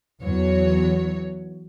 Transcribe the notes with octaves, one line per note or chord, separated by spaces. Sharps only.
E2 F#3 C#5